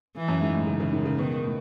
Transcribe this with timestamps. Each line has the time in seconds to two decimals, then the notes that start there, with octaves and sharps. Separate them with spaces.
0.16 E3
0.28 F#2
0.41 G#2
0.54 A2
0.67 C#3
0.80 C#3
0.93 D#3
1.05 C#3
1.18 B2 D#3
1.44 A2